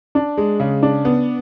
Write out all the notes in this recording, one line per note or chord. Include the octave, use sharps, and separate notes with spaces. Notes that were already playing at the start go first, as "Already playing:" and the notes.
D4
G#3
C#3
D4
B3